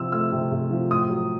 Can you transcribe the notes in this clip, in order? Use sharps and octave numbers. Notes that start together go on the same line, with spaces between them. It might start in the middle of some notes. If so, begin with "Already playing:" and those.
Already playing: C3 F3 E6
A3 E6
C3
C3
F3
A2 D#6
F#3